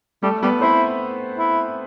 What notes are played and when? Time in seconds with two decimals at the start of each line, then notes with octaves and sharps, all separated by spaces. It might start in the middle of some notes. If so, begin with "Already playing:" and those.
0.23 G3 A3 A4
0.42 G3 B3 B4
0.61 C4 E4 C5
1.38 E4